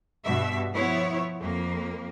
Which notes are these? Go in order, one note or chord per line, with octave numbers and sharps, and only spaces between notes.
G2 B2 E5
F3 B3 E4 C#5
F2 A#3